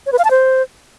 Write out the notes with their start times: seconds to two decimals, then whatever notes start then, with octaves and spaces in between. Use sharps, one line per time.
0.06 C#5
0.12 B4
0.19 F5
0.25 A5
0.31 C5